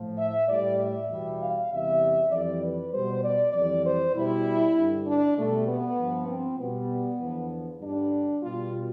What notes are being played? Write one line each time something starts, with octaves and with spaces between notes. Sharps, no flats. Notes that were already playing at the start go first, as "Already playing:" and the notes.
Already playing: A2 F3
E5
A2 G3 D5
E5
E2 B2 G3
F5
E2 C3 G3 E5
F2 E3 G3 D5
B4
B2 G3 C5
D5
F2 E3 G3 D5
C5
B2 G3 E4
G2 D3 G3
D4
B2 G3 A3
B3
G2 F3
C4
B2 G3 B3
E2 D3 F3
G2 D3 G3 D4
B2 G3 F4